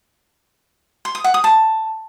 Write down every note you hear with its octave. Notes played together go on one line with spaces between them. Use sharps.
C6
D#6
F#5
D#6
A5